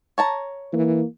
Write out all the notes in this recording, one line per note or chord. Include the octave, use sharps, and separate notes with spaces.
C#5 A5 A#5
E3 A#3